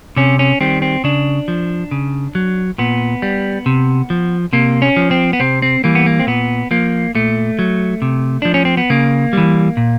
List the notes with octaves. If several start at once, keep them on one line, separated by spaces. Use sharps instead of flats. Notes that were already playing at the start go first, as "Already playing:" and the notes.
C3 C#4
C#4
D#3 G3 C4
C4
C#3 D4
F3
C#3
F#3
A#2 B3
G3
C3
F3
C3 A#3
C#4
F3
C4
B3
C3 C4
C4
E3 G3 A#3
B3
A#3
C4
A#2 B3
F3 A#3
A#2 A3
F#3
C3
F3 D4
C#4
C4
B3
C#3 A#3
E3 G3
A#2